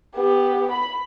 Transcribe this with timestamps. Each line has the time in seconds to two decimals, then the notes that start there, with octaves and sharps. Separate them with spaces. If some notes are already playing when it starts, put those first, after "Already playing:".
0.16 B3 G4
0.71 B5